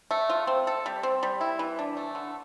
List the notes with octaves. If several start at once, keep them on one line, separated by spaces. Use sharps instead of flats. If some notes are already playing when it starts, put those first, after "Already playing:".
A3
F4
C4
A4
G3
C4
G3
E4
E3
D4
A3
D3